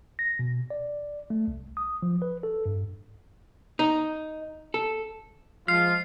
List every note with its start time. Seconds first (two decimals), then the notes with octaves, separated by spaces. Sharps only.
0.19 A#6
0.39 B2
0.70 D5
1.30 A3
1.48 C2
1.77 D#6
2.02 F3
2.22 B4
2.43 A4
2.66 G2
3.79 D#4
4.74 A4
5.68 F3 G#3 F4 F6 C7